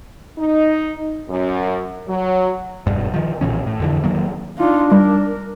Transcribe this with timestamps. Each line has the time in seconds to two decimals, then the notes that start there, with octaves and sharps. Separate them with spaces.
0.38 D#4
1.29 F#2
2.08 F#3
2.87 E1 G2
3.14 D#3 F3
3.41 B1 A#2 E3 C#4
3.66 A2
3.80 F2 D3 E3
4.04 D#3 F#3 A#3
4.58 D4 D#4 F4
4.92 G3 A#4